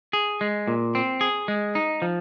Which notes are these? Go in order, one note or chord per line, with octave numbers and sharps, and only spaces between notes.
G#4
G#3
A#2
C4
G#4
G#3
D#4
F3